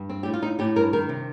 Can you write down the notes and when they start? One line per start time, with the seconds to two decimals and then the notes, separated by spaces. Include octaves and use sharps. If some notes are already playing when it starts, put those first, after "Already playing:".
Already playing: G2
0.09 C4
0.23 A2 G4
0.34 F4
0.42 A2 D#4
0.59 A2 G4
0.76 G2 A#4
0.93 D#3 A#4
1.09 C3